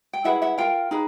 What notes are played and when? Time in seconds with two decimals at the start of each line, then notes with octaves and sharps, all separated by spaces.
0.13 G5
0.24 E4 G#4 B4 E5 F#5
0.42 E5 F#5
0.58 F4 A#4 F5 G5
0.91 D#4 G#4 B4